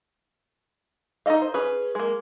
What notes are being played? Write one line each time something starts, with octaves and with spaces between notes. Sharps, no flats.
D#4 E4 A4 D#5 F5
C5
C#4 G#4 B4
G#3 A#3